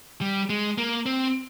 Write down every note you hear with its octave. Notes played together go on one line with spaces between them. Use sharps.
G3
G#3
A#3
C4